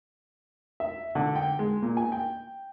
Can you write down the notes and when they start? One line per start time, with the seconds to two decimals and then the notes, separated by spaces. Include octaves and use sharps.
0.80 E5
1.15 D3
1.36 G5
1.59 G#3
1.82 A#2
1.97 G#5
2.12 G5